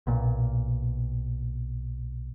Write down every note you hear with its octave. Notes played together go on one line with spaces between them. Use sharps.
B1 A#2